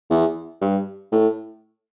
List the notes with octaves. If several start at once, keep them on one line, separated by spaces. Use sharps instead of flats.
E2
G2
A2